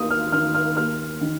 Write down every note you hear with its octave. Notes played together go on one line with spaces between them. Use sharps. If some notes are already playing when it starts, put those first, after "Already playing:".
Already playing: D#2 D#3 D#6 G6
F6
D#3 F6
F6
D#2 F6
D#3